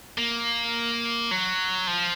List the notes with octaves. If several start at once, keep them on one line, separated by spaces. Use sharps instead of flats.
A#3
F#3
F3